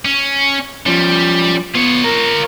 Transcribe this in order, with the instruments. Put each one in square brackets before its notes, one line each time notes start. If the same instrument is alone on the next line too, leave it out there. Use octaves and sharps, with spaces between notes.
[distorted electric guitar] C#4
[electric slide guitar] F3 C#4 [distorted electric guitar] G3
[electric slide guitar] B3 [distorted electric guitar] F4 C#5
[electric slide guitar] A#4